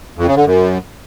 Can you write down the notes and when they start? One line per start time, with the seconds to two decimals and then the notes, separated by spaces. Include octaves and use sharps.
0.17 F2
0.27 C#3
0.36 D3
0.45 F#2